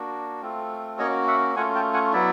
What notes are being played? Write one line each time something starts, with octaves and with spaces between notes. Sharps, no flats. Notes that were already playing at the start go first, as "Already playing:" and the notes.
Already playing: A#3 D4 F#4
A3 C4 F4
A#3 C#4 F#4 C#5 D#5
E5 F#5
A3 C#4 F4 F#5 G#5
G5 A5
F#5 G#5
F#3 B3 E4 D5 E5